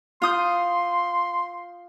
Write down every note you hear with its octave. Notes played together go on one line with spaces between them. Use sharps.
F4 C6 D#6 G6